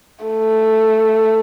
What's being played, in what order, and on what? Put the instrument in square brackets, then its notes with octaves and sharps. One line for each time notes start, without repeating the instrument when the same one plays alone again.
[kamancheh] A3